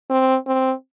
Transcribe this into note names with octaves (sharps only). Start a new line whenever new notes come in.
C4
C4